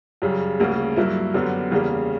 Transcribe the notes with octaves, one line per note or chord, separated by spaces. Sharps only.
F#2 C#3 G3
D2 C#3 G3 A#3
G2 F#3 A#3 E4
F#2 D3 G3 B3
E2 C#3 G3 A#3